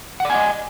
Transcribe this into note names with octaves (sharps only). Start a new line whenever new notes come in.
D5 D#5 F#5 G#5